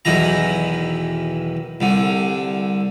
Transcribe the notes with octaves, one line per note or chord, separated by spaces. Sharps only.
B1 E2 D#3 E3 A#5
C2 D3